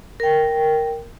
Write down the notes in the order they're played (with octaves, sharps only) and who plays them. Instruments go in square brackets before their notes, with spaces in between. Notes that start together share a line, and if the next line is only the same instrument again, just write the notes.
[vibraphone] A#4 G5